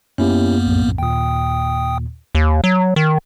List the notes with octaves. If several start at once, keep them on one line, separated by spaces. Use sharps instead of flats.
F#2 A#3 B3 C#4 E4 G4
B1 F2 A2
D#2 A#2 G5 D#6
D#2
F#3
D#3